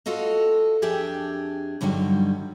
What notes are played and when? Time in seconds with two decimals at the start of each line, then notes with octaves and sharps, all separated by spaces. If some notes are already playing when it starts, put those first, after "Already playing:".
0.06 F4 F#4 A4 D#5 F5
0.82 F2 D4 G4 G#4 E5
1.81 G2 D3 D#3 F#3 G3